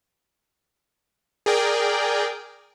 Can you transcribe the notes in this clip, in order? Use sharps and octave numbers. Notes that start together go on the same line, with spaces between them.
G#4 A#4 D5 G5